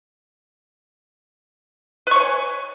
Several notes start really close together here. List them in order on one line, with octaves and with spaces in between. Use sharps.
B4 C#6 C#5 G#5